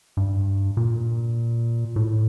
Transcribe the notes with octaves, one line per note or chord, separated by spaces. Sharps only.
G2
A#2
A2